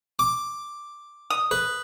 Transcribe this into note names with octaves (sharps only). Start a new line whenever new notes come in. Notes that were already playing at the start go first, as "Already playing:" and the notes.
D6
D#6
B4